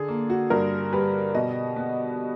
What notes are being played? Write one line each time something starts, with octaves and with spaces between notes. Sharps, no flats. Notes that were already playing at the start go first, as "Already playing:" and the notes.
Already playing: D3 G#4 A4
A#3
F#4
G2 A#4
G3 B4
B2 D#5
B3